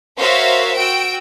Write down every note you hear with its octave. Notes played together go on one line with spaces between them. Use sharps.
F#4 A#4 C5 C#5 E5 F5
F#4 G5 E6 D7